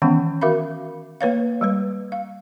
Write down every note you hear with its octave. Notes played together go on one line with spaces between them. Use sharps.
D#3 E3 G#3 B3 C#4 F#5
F#4 A#4 E5 F5 B5
A#3 B4 C#5 F5
G3 G#3 B4
F5